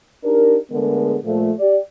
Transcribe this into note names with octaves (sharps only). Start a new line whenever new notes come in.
D4 D#4 G4 A#4
D3 G#3 A3 B3 G#4 A#4
A#2 F3 A3
G4 D5